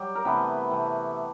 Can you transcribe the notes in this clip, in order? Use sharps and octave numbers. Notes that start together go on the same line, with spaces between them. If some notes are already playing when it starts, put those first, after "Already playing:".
Already playing: F#3 G3 G4
A#4
C3 E3 A3 B3 B4
C3 E3 A3